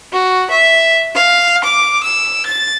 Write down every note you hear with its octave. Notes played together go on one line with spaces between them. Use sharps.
F#4
E5
F5
D6
E6
A6